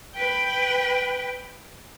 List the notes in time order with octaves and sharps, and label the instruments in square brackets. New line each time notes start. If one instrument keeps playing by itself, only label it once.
[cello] B4 G5